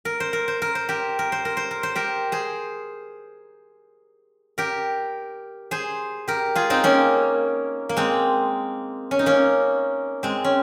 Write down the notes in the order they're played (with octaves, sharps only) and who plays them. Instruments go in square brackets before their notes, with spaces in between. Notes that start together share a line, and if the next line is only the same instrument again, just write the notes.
[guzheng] A#4
C5
A#4
C5
A#4
C5
G4 A#4
A#4
C5
A#4
C5
A#4
C5
G4 A#4
G#4 C5
G4 A#4
G#4 C5
G4 A#4
F4 G#4
C4 D#4
A#3 C#4
A#3
G#3 C4
C#4
D#4
A#3 C#4
G#3 C4
C#4